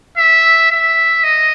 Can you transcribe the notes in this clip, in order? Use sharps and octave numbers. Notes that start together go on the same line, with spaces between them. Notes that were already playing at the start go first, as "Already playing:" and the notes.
E5
E5
D#5